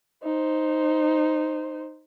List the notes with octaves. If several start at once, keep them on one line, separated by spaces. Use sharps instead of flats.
D#4 C5